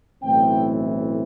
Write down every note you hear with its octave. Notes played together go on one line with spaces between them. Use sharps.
B1 A2 E3 A3 C4 G5